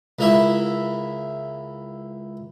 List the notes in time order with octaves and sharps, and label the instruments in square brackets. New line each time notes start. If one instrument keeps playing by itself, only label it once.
[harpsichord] C#2 A#3 E4 E5